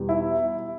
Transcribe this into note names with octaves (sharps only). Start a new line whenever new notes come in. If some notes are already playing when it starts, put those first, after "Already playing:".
Already playing: E2 B2 G3
E4